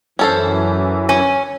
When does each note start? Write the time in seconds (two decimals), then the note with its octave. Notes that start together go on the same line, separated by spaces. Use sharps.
0.19 F#2 E3 C#4 A4 C5
1.09 C#4